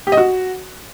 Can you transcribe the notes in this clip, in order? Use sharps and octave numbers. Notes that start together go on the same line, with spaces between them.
G4
D#5
F#4